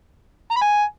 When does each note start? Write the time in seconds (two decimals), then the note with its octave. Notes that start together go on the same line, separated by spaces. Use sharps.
0.51 A#5
0.56 B5
0.61 G#5